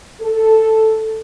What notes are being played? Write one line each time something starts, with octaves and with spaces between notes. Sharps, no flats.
A4